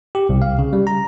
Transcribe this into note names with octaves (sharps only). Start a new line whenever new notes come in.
G4
C2
F5
C#3
G3
A#5